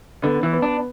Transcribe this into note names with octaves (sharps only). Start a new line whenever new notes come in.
D3 B3
E3
B3
D4